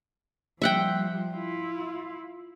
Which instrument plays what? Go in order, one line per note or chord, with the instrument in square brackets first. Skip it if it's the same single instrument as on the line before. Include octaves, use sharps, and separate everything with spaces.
[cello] F3 G3 [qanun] E5 F#5 G5
[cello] E4 F4